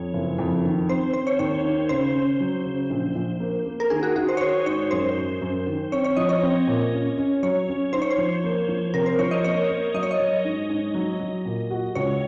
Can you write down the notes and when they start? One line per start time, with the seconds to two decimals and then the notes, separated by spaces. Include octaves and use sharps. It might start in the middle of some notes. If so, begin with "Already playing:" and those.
Already playing: F2 C#5
0.14 F#1
0.38 F2
0.64 D#3
0.89 C4 C5
1.13 C4 C5
1.27 C#5
1.39 D#2 C#5
1.64 D#3
1.89 C#3 C5
2.15 C#4
2.40 F#3
2.65 C#3
2.90 A#1
3.15 A#1
3.40 A#3
3.66 A#3
3.80 A#4
3.90 D#3 G#4
4.03 F#4
4.16 D#4 F#4
4.29 C5
4.37 C#5
4.41 D#3 C5
4.66 G#2 C#5
4.91 F#2 C5
5.16 F#2
5.41 F#2
5.67 D#3
5.92 C4 C#5
6.04 C#5
6.17 F3 D#5
6.29 C#5
6.42 C4
6.67 A#2
6.93 C#4
7.18 C#4
7.43 F#3 C#5
7.68 C#4
7.93 D#4 C5
8.02 C#5
8.11 C5
8.18 F3
8.44 A#3
8.68 F3
8.94 C3 A#4
9.06 C5
9.19 F3 C#5
9.31 D#5
9.44 A#3 C#5
9.69 A#3
9.94 F#3 D#5
10.03 C#5
10.11 D#5
10.20 F#3
10.45 G#2
10.70 G#2
10.95 F#3
11.20 F#3
11.45 A#2
11.70 F#4
11.95 C#2 C#5